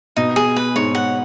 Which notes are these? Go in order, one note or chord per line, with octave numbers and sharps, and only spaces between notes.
B2 D#4
G#4
B4
G#2 C#5
F#5